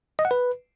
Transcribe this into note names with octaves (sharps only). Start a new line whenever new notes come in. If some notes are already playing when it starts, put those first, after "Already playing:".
D#5
F#5
B4